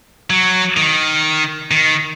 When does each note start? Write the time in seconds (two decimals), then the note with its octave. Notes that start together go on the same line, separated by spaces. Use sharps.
0.30 F#3
0.77 D#3
1.71 D#3